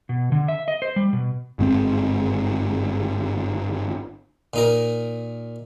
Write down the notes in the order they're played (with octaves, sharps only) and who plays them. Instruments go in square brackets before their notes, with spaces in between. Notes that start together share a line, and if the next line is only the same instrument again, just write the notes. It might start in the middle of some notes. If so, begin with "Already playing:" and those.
[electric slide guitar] B2
D3
E5
D#5
C5
G3
B2
[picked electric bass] G1 G#2 C#3 C4
[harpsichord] A#2 D#4 A#4